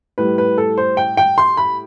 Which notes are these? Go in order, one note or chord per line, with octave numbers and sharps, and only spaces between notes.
A2 G3 B4
B4
A4
C5
G5
G5
C6
B5